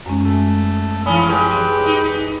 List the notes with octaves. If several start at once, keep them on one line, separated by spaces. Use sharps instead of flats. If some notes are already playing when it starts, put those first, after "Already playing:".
F#2 G#3 C#4
A3
G#2 E3 C#4 G#5 B5 D#6
G#3 G4 B4
D#4